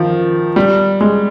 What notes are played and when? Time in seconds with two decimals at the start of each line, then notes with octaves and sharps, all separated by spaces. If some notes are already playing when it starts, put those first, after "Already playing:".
Already playing: D#3 F3
0.56 G3
1.01 G#3